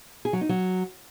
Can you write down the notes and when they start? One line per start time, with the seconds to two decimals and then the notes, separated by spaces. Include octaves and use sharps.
0.25 G#4
0.33 F#3
0.41 D#4
0.49 F#3